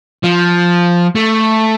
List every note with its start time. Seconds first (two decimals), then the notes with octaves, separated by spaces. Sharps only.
0.23 F3
1.15 A3